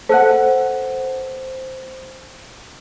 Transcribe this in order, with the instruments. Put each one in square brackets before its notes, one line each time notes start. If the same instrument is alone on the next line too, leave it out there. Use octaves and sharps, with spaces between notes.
[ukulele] A4 B4 F#5 [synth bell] C5